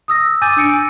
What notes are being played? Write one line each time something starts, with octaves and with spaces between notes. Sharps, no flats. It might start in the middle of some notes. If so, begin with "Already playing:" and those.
D#6 E6 A#6
G#5 D6 E6 G6 A6 D#7
D4 E6 C#7 D7